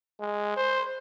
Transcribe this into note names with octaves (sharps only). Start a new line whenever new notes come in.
G#3
C5